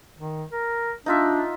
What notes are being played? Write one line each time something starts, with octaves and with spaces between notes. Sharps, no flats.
D#3
A#4
D4 D#4 F4 E5